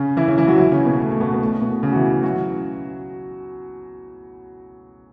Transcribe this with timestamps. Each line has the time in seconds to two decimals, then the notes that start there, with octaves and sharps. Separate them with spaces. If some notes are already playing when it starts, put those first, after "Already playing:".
Already playing: C#3 C#4
0.17 E3 E4
0.28 C#3 C#4
0.38 E3 E4
0.47 F#3 F#4
0.58 E3 E4
0.72 C#3 C#4
0.85 B2 B3
1.00 A3
1.11 A3
1.21 B2 B3
1.34 B3
1.41 A3
1.61 B2 B3
1.82 C#3 C#4
1.92 F#4
1.96 E3 E4
2.23 F#3 F#4